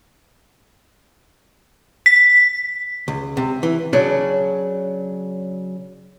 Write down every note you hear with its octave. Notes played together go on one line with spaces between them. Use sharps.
B6
C#2
C3
E3
C#3 F#3 D4